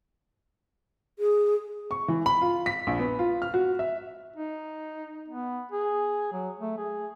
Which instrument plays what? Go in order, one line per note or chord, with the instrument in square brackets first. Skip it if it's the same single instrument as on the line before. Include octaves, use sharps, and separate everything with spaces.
[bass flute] G#4
[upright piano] C#6
E3
B5
F4
B6
A#1
B3
F4
F6
F#4
E5
[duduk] D#4
B3
G#4
F#3
A3
G#4